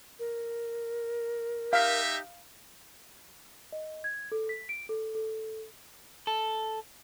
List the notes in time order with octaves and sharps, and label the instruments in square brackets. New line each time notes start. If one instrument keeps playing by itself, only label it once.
[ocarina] A#4
[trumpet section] D#4 G4 E5 [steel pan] F5
[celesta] D#5
G#6
A4
B6
D7
A4
A4
[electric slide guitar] A4